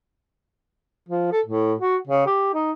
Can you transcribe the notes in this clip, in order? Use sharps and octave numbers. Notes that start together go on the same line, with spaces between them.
F3
A4
A2
F#4
C#3
G4
D#4